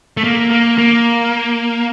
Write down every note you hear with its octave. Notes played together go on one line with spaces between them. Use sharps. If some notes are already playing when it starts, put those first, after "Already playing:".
A3
A#3
A#3
A#3